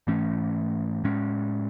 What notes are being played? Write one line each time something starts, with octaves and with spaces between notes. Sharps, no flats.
G#2 E3 A3 C#4
A2 G#3 C#4